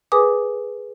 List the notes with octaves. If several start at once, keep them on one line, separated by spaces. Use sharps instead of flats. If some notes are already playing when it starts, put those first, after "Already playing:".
G#4 A#4 B4 G#5 D6 D#6